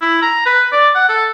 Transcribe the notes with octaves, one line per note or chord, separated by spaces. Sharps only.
E4
A#5
B4
D5
F#5
A4